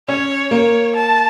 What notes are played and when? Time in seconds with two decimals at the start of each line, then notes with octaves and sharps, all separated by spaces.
0.08 C#4 C#5
0.51 A#3 C#5
0.96 A5